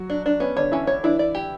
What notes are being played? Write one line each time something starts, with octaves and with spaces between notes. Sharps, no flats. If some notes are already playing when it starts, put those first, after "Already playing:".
Already playing: F#3 F#4
D4
D4
B3 C#4
D3 D4 C#5
E3 C#4 E4
C#5
E3 D4 E4
D5
G4